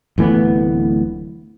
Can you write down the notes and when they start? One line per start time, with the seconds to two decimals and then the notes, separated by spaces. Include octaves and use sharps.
0.18 D1 E3 A3 B3